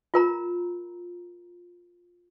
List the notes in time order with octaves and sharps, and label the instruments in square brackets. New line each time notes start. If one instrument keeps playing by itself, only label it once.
[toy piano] F4 A#4 A#5